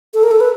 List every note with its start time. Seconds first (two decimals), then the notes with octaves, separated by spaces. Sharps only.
0.14 A4
0.23 A#4
0.31 A4
0.40 B4